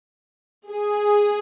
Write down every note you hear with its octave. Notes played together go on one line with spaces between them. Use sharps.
G#4